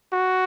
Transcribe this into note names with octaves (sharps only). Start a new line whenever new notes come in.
F#4